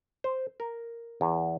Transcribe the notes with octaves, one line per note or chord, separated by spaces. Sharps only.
C5
A#4
E2